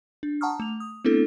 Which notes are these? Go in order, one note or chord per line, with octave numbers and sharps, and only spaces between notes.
D4
F#5 A5 A#5 C#6 D#6 F6
A3 F7
D#6
A3 B3 C4 D4 E4 A4